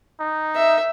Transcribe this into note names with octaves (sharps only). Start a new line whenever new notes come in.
D#4
E5